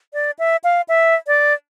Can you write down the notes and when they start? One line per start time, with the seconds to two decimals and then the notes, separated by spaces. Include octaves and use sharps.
0.14 D5
0.39 E5
0.64 F5
0.89 E5
1.27 D5